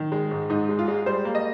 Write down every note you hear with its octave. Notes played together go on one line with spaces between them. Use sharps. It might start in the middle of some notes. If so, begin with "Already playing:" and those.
Already playing: D#3
G#3
G#2
G#2 D#4
G#3
F4
G#3
G3 C5
A#3
D#5